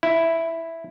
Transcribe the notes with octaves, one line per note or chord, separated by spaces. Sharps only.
E4